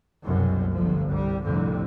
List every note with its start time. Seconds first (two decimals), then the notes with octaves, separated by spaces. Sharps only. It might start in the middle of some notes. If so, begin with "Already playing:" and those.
0.23 F#1 C2 F#2 B2
0.74 G1 D3 F3
1.09 C2 G3
1.46 C2 F2 A2 D3